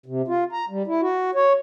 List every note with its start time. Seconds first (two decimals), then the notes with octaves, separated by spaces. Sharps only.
0.06 C3
0.28 F4
0.53 A#5
0.70 G3
0.87 E4
1.01 F#4
1.35 C#5